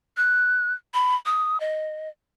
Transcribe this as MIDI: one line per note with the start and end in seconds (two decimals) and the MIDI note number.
0.17 0.73 90
0.94 1.15 83
1.26 1.60 87
1.60 2.09 75